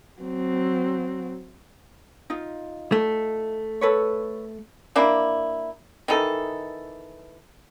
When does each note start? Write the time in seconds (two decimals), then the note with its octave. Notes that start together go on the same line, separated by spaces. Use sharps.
0.22 F#3 C4
2.30 D#4 F4
2.92 A3
3.81 A4 B4 C#5
4.96 A#3 D4 E4
6.08 D#3 E3 D#4 A4